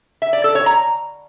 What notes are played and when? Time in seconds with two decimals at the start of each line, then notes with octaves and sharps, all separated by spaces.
0.22 E5
0.33 D5
0.44 A4
0.55 C#5
0.66 A#5